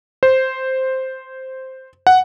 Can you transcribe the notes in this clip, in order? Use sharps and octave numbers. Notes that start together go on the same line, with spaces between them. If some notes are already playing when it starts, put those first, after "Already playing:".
C5
F#5